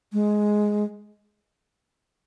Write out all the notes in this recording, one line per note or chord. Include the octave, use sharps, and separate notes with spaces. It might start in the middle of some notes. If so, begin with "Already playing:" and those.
G#3